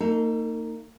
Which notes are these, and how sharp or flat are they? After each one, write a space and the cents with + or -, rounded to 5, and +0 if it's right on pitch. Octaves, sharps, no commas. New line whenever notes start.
A#3 -35 D#4 +0 A4 +25